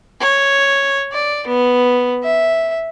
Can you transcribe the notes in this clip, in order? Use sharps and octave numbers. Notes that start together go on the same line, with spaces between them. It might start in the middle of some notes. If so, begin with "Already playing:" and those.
C#5
D5
B3
E5